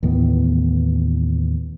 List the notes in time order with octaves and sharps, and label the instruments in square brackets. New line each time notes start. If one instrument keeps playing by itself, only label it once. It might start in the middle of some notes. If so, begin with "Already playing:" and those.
[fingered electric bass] D#2 A2 E3 B3